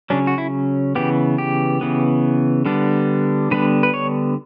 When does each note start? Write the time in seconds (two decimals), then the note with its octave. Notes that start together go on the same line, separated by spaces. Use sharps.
0.10 C#3 F#3 C#4 D4
0.27 F#4
0.38 E4
0.95 C#3 E3 B3 G4
1.38 G4
1.81 C#3 E3 B3
2.65 D3 G3 B3 D4
3.51 D3 G3 B3 D4 B4
3.83 B4
3.94 C#5